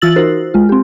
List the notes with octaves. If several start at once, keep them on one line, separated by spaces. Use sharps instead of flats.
E3 F4 E6 A6 F#7
D#4 F#4 A#4 C5
G#3 F4
C4 G4